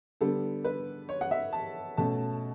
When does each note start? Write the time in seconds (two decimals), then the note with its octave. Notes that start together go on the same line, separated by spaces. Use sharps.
0.21 D3 G3 B3 A4
0.64 B4
1.09 C#5
1.21 F#5
1.31 E5
1.53 A5
1.97 B2 A3 C#4 A5